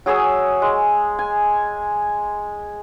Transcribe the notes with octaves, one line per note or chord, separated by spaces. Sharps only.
F#3 G#4 D#6 E6
G#3
G#5